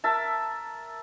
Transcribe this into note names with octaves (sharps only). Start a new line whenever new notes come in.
A#4 E5 A5